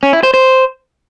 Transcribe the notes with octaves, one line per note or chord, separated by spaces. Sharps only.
C#4
E4
C5
C5